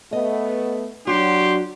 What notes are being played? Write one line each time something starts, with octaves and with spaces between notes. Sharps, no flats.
A3 B3 D#5
F#3 D4 F#4 G4 C6